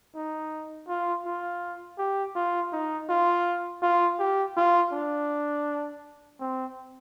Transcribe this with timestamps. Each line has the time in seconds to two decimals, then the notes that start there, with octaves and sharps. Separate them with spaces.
0.16 D#4
0.88 F4
1.25 F4
1.98 G4
2.35 F4
2.73 D#4
3.09 F4
3.82 F4
4.19 G4
4.57 F4
4.93 D4
6.40 C4